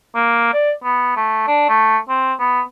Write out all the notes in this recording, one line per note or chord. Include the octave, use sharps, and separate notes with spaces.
A#3
D5
B3
A3
D4
A3
C4
B3